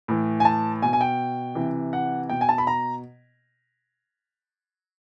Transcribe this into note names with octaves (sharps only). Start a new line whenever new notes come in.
A2 E3
G#5
A5
B2 G#5
G#5
G5
C3 E3
F#5
B2 G5
G#5
A5
B5
A#5